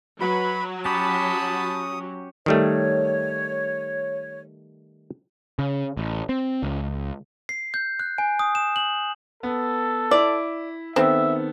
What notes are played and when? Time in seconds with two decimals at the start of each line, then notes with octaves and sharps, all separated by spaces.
0.21 F#3 F#4 B4 B5
0.85 C#4 F#4 G4 A5 B5 D#6
2.46 D#3 G3 A3 C#5
5.59 C#3
5.97 A1
6.29 C4
6.63 C#2
7.49 C7
7.74 G6
7.99 F#6
8.18 G#5
8.39 D#6
8.55 E7
8.76 F#7
9.43 B3 A4
10.11 E4 D5
10.96 D#3 B3 C4 A4 E5